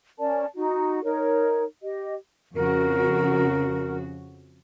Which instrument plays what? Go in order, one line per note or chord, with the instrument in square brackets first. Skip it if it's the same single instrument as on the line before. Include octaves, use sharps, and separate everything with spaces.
[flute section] C#4 A#4 D5 A5
D#4 F#4
D#4 A#4 C#5
G4 D#5
[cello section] F2 C#3 F#4 [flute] A#4